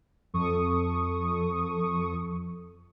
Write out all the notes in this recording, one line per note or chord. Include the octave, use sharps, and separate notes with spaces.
F2 A4 C#6 D#6